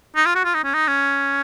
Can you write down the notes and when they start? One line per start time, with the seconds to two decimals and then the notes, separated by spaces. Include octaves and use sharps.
0.16 D#4
0.26 F4
0.35 F#4
0.44 F4
0.54 D#4
0.64 C#4
0.74 D#4
0.88 C#4